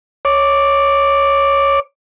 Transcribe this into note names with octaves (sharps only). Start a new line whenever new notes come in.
C#5 D6